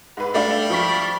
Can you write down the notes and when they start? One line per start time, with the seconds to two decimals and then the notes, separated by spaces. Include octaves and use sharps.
0.17 G#2 B4
0.34 G3 A3 D4 F5
0.70 F3 C#6 B6